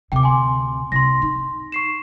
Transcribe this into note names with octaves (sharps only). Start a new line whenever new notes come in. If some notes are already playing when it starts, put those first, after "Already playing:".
D2 C3 G5 D6
G#5 C6
C2 C6 A#6
D#4
C#6 C7 E7